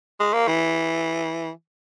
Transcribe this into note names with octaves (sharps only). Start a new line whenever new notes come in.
G#3
A#3
E3